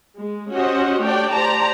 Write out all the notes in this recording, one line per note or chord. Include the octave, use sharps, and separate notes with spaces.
G#3
C#4 F#4 G4 C5 D#5 F#5
A3 D4 G4 C#5 D5 G5
G4 C5 D5 A5 A#5